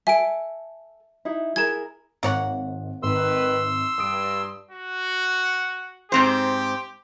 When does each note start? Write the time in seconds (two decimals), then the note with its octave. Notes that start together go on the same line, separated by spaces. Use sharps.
0.07 A4 E5 G#5 A5 D7
1.25 D#4 E4 E5
1.56 E4 G#4 A#4 G#6 E7
2.23 G#1 A#3 C#5 F#5
3.03 G#1 D#3 B4 C6 E6
3.98 G2 D#6 D7
4.71 F#4
6.12 G#2 C4 G4 C5